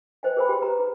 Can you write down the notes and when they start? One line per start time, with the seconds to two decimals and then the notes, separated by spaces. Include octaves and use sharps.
0.23 B4 C5 D#5 G5
0.37 G#4 A#4 C5 G5 B5
0.49 G4 G5
0.62 B4 A#5
0.79 D#4